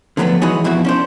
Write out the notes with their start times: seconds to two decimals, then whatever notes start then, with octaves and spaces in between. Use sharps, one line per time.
0.17 D3 F3 F#3 G#3 A3 B3
0.41 E3 G#3 E4 F#4 G#4 C#5
0.64 F2 B2 E3 E4 F#4
0.85 C#4 D4 C5